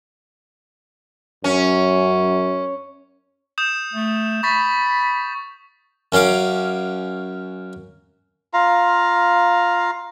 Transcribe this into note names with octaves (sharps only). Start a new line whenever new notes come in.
F#2 C#4
D#6 G6 E7
A3
B5 C#6 A6 B6
F#2 C#4 F5 D6
F4 F5 A#5